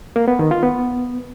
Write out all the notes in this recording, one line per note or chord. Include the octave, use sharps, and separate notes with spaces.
A#3
B3
D#3
F4
B3